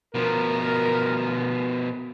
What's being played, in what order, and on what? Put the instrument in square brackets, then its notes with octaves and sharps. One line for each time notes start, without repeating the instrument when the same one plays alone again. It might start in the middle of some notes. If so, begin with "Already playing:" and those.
[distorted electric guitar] B2 F3 [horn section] A#4